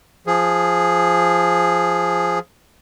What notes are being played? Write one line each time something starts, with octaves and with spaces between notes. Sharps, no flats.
F3 G#4